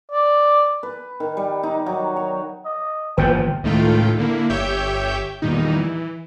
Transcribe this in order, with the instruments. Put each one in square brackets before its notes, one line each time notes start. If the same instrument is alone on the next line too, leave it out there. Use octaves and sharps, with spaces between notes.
[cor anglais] D5
[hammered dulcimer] B4
D#3
G3
D#4
F#3
C#5
[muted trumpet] D#5
[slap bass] G1 A#2 F3 [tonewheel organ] E3 B4 C5 [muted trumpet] G5
[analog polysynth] C#2 A2 D#3 A3 F4 G5
D3 A#3 E4
G1 G4 C#5 E5 G5 G6
E2 A#2 D#3 G3 D#4
E3